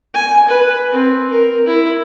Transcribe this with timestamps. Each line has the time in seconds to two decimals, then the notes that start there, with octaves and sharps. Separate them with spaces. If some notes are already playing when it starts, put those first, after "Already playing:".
0.14 G#5
0.48 B4
0.92 C4
1.31 A#4
1.67 E4